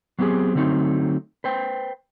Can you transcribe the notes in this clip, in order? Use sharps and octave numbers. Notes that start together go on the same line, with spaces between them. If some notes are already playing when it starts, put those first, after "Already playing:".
F#3 B3 C4 G4 G#4
D3 F#3 A3 C4 D#4
B4 C5 G5